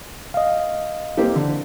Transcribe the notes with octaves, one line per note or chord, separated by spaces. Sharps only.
D#5 F5
A#3 C4 G4
D3